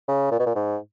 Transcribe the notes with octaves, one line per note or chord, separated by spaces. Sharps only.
C#3
A#2
B2
A#2
G#2